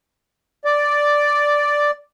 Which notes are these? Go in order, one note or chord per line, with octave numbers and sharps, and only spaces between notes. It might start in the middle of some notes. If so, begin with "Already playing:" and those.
D5